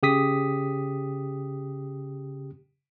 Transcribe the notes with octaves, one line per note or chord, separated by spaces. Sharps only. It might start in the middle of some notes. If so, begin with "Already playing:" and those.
C#3 G4 D#6 B6